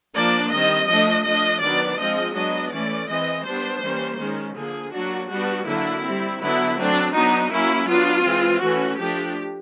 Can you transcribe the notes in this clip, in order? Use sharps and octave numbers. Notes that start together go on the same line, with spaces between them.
F3 A#3 D4 D5
D#3 G3 C4 D#5
F3 A3 D4 D#5
F3 A3 D4 D#5
D#3 F#3 B3 D4 D5
F3 G#3 C4 D#5
F#3 B3 D4 D#5
E3 A3 C#4 D5
E3 G#3 C4 D#5
G3 B3 D4 C5
E3 G3 A#3 C#4
D#3 G#3 C#4
D3 F3 A#3 G#4
F#3 A#3 D4 F#4
G3 B3 D4 F#4
D3 F#3 A#3 D4 E4
G3 C4
D3 F#3 B3 D4 E4
F#3 A3 C4 D4
F#3 B3 D4 D#4
F#3 A#3 C#4 E4
F#3 B3 D4 F4
E3 G#3 C4
E3 A3 C#4 F#4
F3 A3 D4 G4